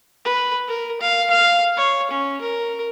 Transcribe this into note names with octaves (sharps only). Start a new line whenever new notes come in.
B4
A#4
F5
F5
C#5
C#4
A#4